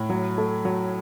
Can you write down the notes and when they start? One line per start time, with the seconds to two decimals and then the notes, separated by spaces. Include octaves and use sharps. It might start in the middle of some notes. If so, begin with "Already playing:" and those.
Already playing: A2
0.10 F#3
0.38 A3
0.65 F#3